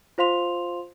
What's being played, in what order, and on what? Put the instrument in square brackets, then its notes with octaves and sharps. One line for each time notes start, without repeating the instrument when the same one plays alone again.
[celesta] F4 C5 F5 C6 F7